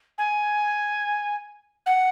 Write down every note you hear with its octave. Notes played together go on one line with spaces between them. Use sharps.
G#5
F#5